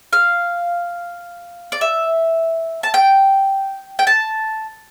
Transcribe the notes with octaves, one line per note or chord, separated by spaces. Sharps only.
F5
D5
E5
A5
G5
G5
A5